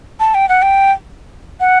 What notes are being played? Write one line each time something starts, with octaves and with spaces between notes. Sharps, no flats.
A5
G5
F#5
G5
F#5